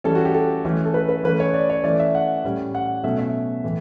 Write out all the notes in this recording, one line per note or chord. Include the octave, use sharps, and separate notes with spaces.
E3 G3 C#4 A4
F#4
G4
A4
E3 A3 C#4
A4
B4
B4
E3 A3 C#4 B4
C#5
D5
C#5
E3 A3 C#4 D5
E5
F#5
A2 G3 C#4
F#5
B2 F#3 A3 C#4 E5
E5
A2 E3